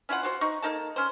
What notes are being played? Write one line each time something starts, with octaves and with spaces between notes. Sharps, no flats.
C#4 E4 F4 F#5
F4 F#4 C5
D#4 C#6
A#3 D#4 A4 A5
C#4 C5